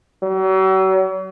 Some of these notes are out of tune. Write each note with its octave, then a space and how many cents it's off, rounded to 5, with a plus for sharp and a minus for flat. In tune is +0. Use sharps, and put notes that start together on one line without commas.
F#3 +40